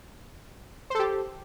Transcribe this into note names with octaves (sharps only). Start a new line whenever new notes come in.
G4 A4 C5